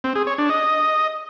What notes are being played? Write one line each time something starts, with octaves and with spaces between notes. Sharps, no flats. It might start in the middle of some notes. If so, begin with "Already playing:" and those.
C4
G#4
C#5
D4
D#5